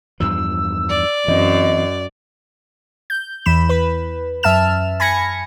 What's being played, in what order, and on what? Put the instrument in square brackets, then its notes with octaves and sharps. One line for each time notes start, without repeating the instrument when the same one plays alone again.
[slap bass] E2 G2 F3 [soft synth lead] E6
[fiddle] D5
[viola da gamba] F#2 [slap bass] E3 C4 [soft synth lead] D#5
[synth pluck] G6
E2 E3 B5 E7
B4 B5
F#2 E5 A5 F6 E7
G#5 B5 G#6 A#6 C#7